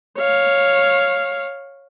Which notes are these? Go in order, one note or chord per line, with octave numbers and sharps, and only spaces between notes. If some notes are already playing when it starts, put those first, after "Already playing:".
C#5 F5